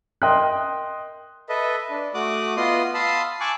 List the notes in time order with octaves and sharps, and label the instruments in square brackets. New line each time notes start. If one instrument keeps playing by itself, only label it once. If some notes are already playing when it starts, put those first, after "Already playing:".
[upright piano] A#4 D#5 G5 C6 D#6 F#6
[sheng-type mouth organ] A4 B4 D#5 E5
D4
A3 F#4 D6 D#6 F#6
B3 F4 D#5 C6 D#6
F5 A5 B5 C6 D#6 E6
G#5 A5 C#6 D6 E6 F#6